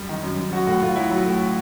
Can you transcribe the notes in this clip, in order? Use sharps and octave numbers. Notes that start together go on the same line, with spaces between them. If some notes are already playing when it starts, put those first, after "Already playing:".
Already playing: F#2 G3 G4
D#3
F#2
F#2
F#3 F#4
A2 F#4
A2 F4
F#3 E4
F#3
A2